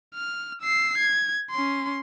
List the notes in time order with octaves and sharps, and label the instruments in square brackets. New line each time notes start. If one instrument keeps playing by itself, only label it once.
[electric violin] F6
E6 C7
G#6
C#4 C6